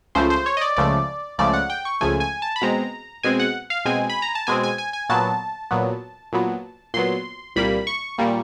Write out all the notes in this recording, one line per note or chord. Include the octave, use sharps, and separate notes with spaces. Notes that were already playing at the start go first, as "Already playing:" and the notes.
C#2 C#3 F3 A3 C5
C5
C#5
D#5
D5
C#2 C#3 F3 A3 D5
C#2 C#3 F3 A3 D5
F#5
G5
C#6
C#2 C#3 F3 A3 G#5
G#5
A5
B5
B2 G#3 C4 A#5
B2 G#3 C4 G#5
F#5
F5
B2 G#3 C4 G#5
B5
A#5
A5
B2 G#3 C4 G#5
G#5
G#5
G#5
A#2 F#3 B3 A5
A#2 F#3 B3
A#2 F#3 B3
A#2 F#3 B3 C6
C2 A#2 G3 A#3 B5
C#6
A#2 G3 A#3